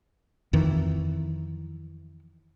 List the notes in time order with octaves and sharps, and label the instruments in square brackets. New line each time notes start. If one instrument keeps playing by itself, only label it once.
[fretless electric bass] F2 D#3 E3